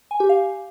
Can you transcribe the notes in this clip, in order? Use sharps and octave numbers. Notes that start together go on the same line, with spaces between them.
G#5
G4
F5